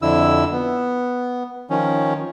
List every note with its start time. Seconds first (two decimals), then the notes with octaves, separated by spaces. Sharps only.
0.02 F2 D3 E4 E6
0.52 B3
1.70 D#3 F3 C#4